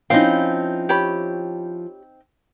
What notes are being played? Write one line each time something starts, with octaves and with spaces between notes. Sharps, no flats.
F3 C4 C#4 D#4 E4 F5
G4 C#5 B5